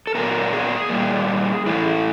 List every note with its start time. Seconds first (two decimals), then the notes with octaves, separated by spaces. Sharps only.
0.07 A4
0.15 A#2 F#3 B3 A#4
0.53 G#4
0.90 A#2 G3 A#3
1.66 A2 E3 A3 E4